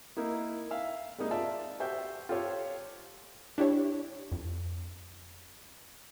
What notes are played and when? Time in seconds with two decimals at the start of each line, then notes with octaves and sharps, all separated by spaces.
0.17 A#3 D#4 E4
0.71 E5 F5
1.18 G3 G#3 A#3 D#4
1.31 F4 D5 E5 A5
1.80 F#4 G4 C5 E5 G5 G6
2.29 F4 G4 A4 C5 C#5
3.58 D4 E4 G4 C#5
4.32 F2